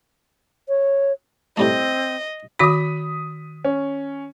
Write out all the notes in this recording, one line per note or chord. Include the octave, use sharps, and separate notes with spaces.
C#5
A2 G3 A3 C4 D#5
D#3 F#4 B5 D#6 B6
C#4